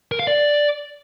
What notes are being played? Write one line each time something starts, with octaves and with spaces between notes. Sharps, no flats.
A#4
F5
D5